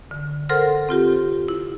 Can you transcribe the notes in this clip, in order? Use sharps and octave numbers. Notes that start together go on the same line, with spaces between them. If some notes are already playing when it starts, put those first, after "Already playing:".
D3
A4 A#4 C5 F#5 C6 F6
C4 F4 G4
E4